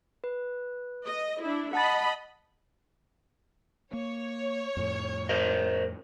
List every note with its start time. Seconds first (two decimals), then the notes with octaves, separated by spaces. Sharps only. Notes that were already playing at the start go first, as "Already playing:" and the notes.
0.24 B4
1.07 D#5
1.42 D4 E4
1.73 D#5 F#5 A5 B5 A6
3.93 A#3 C#5
4.77 F2 A2
5.29 A#4 C5 D#5